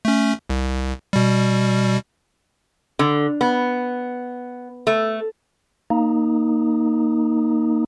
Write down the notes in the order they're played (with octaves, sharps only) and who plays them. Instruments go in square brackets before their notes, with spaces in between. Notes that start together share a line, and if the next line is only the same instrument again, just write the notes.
[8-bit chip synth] A3 C#4
C2
B2 G3
[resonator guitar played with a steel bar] D3
B3
A3
[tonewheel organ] A#3 D#4